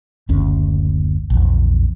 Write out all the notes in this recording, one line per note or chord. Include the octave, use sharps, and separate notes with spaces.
F#1 D2 C#4
A#1 E2